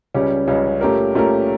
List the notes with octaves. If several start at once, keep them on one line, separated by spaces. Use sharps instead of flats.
C#2 C#3 G3 C#4 G4
C#2 C#3 G3 C#4 G4
A#2 A3 C#4 G4 A#4
A#2 A3 C#4 G4 A#4